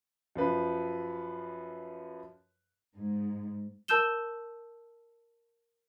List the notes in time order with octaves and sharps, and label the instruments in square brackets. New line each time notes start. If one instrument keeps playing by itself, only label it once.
[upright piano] F#2 F3 B4
[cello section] G#2
[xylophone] A#4 A5 E6 G6 E7 G7